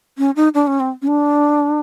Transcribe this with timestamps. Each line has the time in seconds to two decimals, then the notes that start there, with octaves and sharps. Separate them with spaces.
0.18 C#4
0.36 D#4
0.54 D4
0.67 C#4
0.80 C4
1.02 C#4
1.08 D4